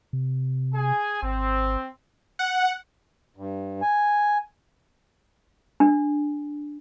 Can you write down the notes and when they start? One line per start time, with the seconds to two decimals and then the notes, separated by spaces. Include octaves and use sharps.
0.13 C3
0.74 G#4 G#5
1.23 G#1 C4
2.39 F#5
3.36 G2
3.82 G#5
5.80 D4